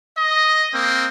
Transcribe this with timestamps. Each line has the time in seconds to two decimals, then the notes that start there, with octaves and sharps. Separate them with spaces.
0.17 D#5
0.74 A#3 C4